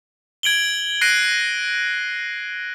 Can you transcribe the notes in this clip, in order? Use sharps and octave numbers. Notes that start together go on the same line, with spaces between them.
G#6 D7 F#7 G7
F#6 A#6 C7 D7 D#7